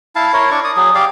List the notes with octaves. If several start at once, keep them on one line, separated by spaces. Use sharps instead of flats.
E4 F5 A5
E4 A#4 C#5
D4 D5 C#6
D5 D#6
F#3 G#4
G4 D5 F5